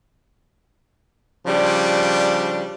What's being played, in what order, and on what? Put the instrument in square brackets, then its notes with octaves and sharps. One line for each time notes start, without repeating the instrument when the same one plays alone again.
[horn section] C#3 F3 G3 D4